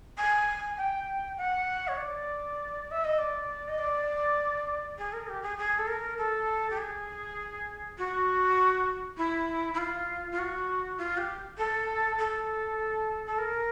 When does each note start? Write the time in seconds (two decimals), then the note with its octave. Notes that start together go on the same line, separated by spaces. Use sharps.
0.17 G#5
0.77 G5
1.37 F#5
1.88 C#5
1.97 D5
2.91 E5
3.04 D#5
3.18 D5
3.68 D#5
3.78 D5
4.98 G#4
5.12 A#4
5.27 G4
5.42 G#4
5.57 G#4
5.78 A4
5.87 A#4
6.18 A4
6.70 G4
6.77 G#4
7.98 F#4
9.17 E4
9.73 E4
9.78 F4
10.31 F4
10.38 F#4
10.98 F4
11.17 G4
11.57 A4
12.18 A4
13.26 A4
13.38 A#4